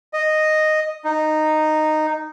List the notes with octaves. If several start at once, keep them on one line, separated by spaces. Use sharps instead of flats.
D#5
D#4